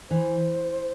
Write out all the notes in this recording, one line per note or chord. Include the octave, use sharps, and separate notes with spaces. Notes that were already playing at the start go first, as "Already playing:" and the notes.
E3 C5